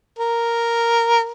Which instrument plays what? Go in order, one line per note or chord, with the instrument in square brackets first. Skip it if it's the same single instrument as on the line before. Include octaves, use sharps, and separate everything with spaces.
[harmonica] A#4